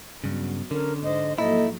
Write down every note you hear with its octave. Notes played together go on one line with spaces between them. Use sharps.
G2 C#3 F#3 B3
D3 C#4 A#4
G#2 C5 D#5
G#2 F3 F#3 A#3 E4 A4 D#5